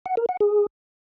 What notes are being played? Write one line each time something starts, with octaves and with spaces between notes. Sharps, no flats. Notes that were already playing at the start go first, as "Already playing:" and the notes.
F#5
A#4
F#5
G#4